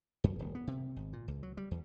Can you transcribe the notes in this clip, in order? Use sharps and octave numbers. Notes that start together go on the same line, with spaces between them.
F#2
D#1
B3
C3
G#1
A#2
C#2
F#3
G3
E2